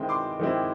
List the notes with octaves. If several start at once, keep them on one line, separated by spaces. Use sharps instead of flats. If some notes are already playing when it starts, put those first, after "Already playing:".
Already playing: D#3 G#3 C4 E4
C6 D6
D#3 G#3 C4 E4